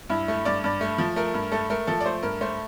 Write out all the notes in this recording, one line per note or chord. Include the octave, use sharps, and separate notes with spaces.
G2 E4
A3
G2 D5
G2 D5
A3
F3
A3 A#4
G2
A3 A4
A3 A#4
F3 A4
D5
A3 C5
G2 A#4
A3 C5